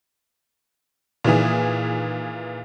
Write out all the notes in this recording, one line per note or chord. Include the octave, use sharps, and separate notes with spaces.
A#2 D#3 E3 G#4